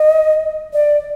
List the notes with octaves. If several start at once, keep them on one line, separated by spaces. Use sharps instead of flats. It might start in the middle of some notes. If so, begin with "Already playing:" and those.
Already playing: D#5
D5